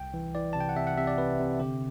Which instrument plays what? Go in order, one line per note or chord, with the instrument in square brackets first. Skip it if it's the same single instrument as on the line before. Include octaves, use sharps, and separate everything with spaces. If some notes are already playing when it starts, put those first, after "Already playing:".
Already playing: [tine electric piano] C2 G5
E3
E3 D5
C3 A5
G5
F#5
C3 E5
F#5
C3 E5
D5
C3 B4
C3
D3 G4